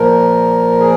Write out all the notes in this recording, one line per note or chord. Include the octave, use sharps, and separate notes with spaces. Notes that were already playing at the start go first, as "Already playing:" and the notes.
Already playing: A#2 F3 A#4
G#4